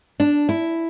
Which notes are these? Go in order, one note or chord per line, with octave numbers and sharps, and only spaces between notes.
D4
E4